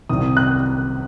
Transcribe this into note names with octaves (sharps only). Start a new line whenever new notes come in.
C2 C3 D#3 D#6
F#6